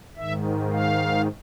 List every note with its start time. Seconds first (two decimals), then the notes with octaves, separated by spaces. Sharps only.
0.16 G#2 D#3 E5
0.72 F5